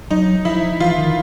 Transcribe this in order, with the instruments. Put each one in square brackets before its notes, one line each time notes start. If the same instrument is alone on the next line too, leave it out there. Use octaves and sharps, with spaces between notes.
[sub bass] F#3 [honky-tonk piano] D#4
[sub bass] F3 [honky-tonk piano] E4
[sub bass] E3 [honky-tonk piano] F4
[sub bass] D#3